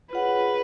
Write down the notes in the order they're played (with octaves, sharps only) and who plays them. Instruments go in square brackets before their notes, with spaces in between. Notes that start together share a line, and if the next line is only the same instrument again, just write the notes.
[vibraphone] F4 G#4 C#5 F#5 [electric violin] B4